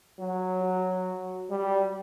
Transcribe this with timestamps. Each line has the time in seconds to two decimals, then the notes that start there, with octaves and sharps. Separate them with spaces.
0.19 F#3 F#4
0.64 F#4
1.50 G3